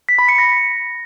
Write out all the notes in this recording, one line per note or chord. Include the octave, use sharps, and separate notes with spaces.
B6
B5
C#7
A#6